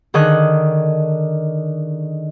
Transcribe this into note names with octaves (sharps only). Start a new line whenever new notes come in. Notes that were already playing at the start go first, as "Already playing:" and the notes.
D3 D#3 G#4 D#5 C#6 F#6